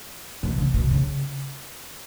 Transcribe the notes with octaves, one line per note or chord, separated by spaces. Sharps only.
B2
C#3
B2
C#3